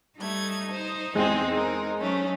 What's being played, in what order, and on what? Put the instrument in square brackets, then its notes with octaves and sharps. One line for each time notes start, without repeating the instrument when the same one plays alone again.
[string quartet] G3 A3 G#6 [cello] D#4
[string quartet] C5
[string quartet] E2 C4 G#4 [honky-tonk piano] G#3 C5
[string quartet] A#4
F#3 A3 C#4